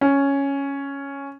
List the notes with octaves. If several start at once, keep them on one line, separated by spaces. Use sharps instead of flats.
C#4